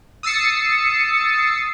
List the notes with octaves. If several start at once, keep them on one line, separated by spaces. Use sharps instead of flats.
D#6 E6 A6 C7 C#7